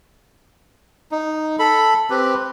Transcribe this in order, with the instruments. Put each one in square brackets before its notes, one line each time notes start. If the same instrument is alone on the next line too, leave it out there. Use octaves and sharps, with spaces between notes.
[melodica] D#4
A4 B5
C4 G4 B4